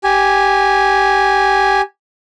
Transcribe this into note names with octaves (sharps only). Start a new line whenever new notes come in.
G4 G#5